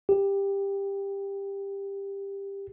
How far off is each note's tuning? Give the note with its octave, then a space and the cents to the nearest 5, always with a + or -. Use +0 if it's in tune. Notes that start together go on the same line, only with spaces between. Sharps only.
G4 +15